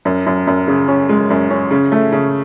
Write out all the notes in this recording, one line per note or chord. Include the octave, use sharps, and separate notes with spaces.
F#2
F#2
F#2
C#3
C#4
G#3
F#2
C#4
C#3
A3
C#3